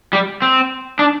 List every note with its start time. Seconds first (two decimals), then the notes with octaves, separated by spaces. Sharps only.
0.13 G3
0.42 C4
0.99 D4